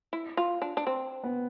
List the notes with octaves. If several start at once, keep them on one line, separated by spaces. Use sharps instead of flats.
E4
F4
D4
D4
C4
B3